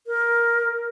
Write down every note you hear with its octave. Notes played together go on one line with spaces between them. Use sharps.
A#4